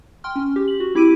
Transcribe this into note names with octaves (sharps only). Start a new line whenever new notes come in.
G5 C6 F6
C#4
G4
F#7
F#4
C4 E4 G4 D6 D7 D#7